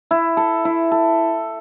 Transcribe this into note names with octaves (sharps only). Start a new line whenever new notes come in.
E4
A4
E4
A4